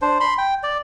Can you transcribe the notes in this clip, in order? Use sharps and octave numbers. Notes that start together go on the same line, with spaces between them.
D4 C5
B5 C6
G5
D5